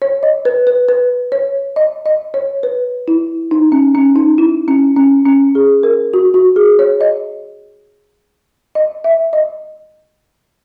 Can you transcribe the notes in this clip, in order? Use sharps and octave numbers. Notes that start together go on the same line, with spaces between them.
C#5
D#5
B4
B4
B4
C#5
D#5
D#5
C#5
B4
E4
D#4
C#4
C#4
D#4
E4
C#4
C#4
C#4
G#4
A#4
F#4
F#4
G#4
C#5
D#5
D#5
E5
D#5